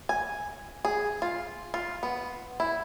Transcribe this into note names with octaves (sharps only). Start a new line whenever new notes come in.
G#5
G#4
F4
F4
B3
E4